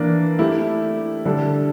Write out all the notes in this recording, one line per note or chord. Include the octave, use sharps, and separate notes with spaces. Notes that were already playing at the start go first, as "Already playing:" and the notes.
Already playing: E3 A#3 D4
A3 E4 G4
D3 G3 D4 A4